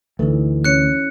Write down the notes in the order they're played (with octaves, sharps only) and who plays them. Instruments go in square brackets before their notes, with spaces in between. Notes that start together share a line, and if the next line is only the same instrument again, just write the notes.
[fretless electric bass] D2 [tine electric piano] E3 [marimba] D#4 E4 A4
[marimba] C#4 C#5 [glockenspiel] F#6 C#7